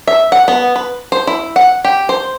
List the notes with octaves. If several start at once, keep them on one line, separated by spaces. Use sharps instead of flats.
E5
F#5
B3
B4
C5
E4
F#5
G4
C5